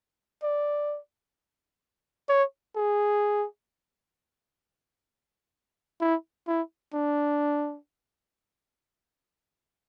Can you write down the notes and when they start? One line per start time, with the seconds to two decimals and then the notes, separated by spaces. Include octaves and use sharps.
0.43 D5
2.29 C#5
2.76 G#4
6.01 E4
6.48 E4
6.94 D4